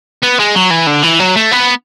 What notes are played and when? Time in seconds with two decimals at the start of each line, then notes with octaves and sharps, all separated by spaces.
0.23 B3
0.40 G#3
0.55 F#3
0.71 E3
0.87 D3
1.02 E3
1.19 F#3
1.35 A3
1.51 B3